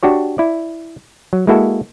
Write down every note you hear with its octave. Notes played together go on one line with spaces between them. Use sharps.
D4 F#4 G4 C#5
E4 D5
F#3
G#3 A#3 E4 F#4 A4